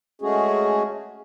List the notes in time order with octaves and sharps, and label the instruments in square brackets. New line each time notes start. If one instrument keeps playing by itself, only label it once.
[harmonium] G#3 A3 C#4 F#4 G#4